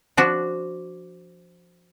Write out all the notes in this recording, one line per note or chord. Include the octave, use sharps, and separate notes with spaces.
F3 D4 F#4